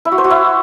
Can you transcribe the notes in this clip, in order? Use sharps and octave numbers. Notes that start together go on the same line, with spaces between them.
E4
F#4
C5
F#4
E4